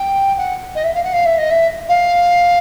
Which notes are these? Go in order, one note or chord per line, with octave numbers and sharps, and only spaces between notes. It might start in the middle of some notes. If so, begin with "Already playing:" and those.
Already playing: G5
F#5
D#5
E5
F5
F#5
F5
E5
D#5
E5
F5